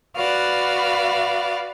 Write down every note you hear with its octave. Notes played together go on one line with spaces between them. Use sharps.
F#4 B4 D5 F5